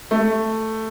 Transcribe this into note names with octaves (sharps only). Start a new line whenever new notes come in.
A3